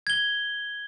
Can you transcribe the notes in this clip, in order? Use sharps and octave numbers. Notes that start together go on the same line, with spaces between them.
G#6 G7